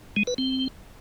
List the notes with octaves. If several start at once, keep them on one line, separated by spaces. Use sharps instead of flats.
G#3
B4
C4